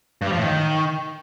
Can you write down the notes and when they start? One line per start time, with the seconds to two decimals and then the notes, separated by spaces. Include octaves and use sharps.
0.22 G2
0.27 G3
0.32 F3
0.38 A2
0.43 D#3